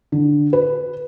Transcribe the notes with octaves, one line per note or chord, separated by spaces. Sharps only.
D3
B4